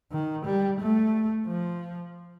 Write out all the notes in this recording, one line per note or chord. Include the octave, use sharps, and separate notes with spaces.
D#3
G3
A3
F3